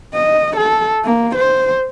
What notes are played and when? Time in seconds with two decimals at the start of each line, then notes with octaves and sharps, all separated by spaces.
0.14 D#5
0.57 A4
1.05 A#3
1.36 C5